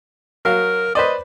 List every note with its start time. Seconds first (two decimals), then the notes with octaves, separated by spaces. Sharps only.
0.45 F#3 A#4 F5
0.95 B4 C5 D5 D#5